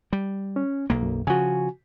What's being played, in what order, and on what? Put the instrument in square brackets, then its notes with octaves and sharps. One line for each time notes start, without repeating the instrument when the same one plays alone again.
[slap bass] G3
[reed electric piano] C#4
[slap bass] B1 A#3
[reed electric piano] F#2
[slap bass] C#3 F3 [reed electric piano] F#4 G#5